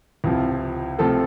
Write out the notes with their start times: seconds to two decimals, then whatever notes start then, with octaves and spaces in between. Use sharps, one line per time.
0.24 C#2 C3 F3 E4
0.99 C3 F3 A3 A4